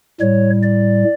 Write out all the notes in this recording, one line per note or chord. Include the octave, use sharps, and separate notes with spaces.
A2 G3 C#5
D5